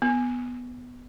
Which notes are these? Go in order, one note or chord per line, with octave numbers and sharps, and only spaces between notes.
B3